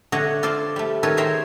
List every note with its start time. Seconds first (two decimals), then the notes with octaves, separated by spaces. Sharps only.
0.12 D3 A3 C#5 D#5 F#5
0.43 F4 A4 C5 D5
0.76 G3 A3
1.03 D#3 A4 B4 C#5
1.17 G#4 C5 C#5 E5 G5 A#5